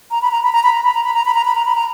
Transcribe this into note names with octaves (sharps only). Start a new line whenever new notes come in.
A#5
B5
A#5
B5
A#5
B5
A#5
B5
A#5
B5
A#5
B5
A#5
B5
A#5
B5
A#5